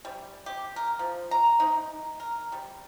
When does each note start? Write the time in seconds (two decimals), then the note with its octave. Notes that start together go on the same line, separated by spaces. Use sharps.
0.05 G3
0.46 G4
0.76 A#4
0.99 F3
1.31 A#5
1.60 D#4
2.20 A#4
2.52 G3